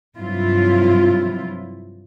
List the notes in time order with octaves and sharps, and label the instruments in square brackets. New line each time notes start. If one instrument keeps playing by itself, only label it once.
[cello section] G2 C3 F3 F#3 E4 F4